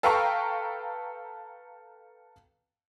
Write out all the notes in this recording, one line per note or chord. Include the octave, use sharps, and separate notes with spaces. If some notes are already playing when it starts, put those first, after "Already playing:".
A4 B4 F5 G5 A#5 C#6